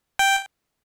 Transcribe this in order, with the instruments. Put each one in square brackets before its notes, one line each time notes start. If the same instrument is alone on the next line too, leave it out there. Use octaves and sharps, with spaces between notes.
[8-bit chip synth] G5